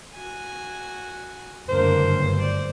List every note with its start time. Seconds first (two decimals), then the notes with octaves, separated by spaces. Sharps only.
0.14 F#4 G#5
1.69 F#1 D2 G2 A#3 D4 C5
2.38 C5 D5